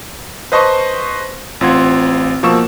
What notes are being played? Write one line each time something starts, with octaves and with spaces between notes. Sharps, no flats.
B4 C5 D#5 A5 C6 C#6
A1 C4 F4 F#5 C6 G#6
B2 F3 A#3 C#6 E6 E7